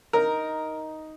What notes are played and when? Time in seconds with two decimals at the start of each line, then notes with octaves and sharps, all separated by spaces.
0.13 D#4 A#4